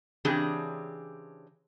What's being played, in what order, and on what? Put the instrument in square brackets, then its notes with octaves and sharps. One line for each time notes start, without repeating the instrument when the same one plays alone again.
[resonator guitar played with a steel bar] C#3 E3 C4 D4 G4 G#4